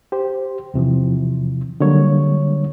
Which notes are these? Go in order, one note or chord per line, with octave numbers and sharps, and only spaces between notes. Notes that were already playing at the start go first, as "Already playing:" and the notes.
G4 C5
E2 C3 E3 F3
D3 F#3 G3 A#3 C#5